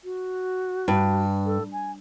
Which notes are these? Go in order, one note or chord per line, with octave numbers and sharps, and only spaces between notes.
F#4
G2
A4
G#5